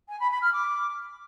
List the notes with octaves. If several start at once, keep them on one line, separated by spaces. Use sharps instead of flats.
G#5
B5
B5
F6
D6